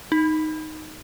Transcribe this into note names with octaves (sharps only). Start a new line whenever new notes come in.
D#4